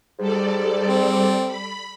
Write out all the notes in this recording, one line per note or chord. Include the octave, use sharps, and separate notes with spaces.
G#2 G3 A4 D5
C4
B5